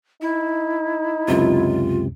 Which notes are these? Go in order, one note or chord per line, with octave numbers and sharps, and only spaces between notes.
D#4 E4
C#2 F#2 C3 F4